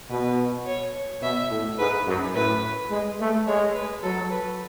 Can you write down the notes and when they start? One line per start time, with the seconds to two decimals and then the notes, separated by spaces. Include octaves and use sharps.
0.10 B2 B4
0.66 C#5
1.22 B2 E5
1.50 A2
1.78 G#2 B4
2.07 F#2
2.34 A2 B4
2.90 G#3
3.19 A3
3.46 G#3 C#5
3.74 B4
4.03 F#3 A4
4.31 B4